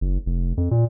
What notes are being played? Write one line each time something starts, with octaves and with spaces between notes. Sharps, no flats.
F#1
F1
F2
A#2